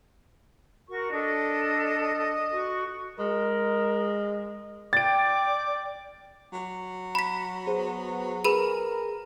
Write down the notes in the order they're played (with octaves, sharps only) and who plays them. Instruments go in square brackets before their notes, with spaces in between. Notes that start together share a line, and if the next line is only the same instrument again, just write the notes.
[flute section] F#4 A#4 C#6
[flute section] D4 A4 [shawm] D#5
[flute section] F#4 C#6
[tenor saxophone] G#3 [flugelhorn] A#4
[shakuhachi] D5 [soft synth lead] G5 [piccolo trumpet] D6 [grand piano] A6 D7
[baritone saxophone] F#3
[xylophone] B5 B6
[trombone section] B3 [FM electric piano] G#4 C5
[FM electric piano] G#4 [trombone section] A#4 [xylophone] B4 B5 D#7